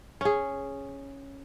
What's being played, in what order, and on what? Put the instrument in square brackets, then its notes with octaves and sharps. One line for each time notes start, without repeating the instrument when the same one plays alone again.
[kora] C#4 G#4